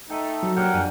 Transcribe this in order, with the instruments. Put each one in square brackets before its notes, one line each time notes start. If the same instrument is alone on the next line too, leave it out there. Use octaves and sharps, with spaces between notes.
[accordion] A3 D#4 A4 [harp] G5 D#7
[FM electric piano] F#3
[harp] G3 A#3 D4 [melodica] A#4 F#5 G5 [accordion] C#5
[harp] F2 [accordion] G#5